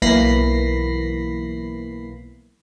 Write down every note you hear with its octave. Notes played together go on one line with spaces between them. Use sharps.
B1 E3 A#3 B5 A#6 C7